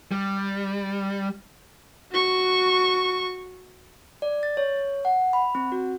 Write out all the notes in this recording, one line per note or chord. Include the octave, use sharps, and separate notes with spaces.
G3
F#4 C#6
D5
A6
C#5
F#5
B5
C4
F#4